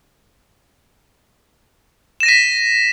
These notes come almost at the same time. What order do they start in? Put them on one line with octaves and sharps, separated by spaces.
E7 A#6 D#7 B6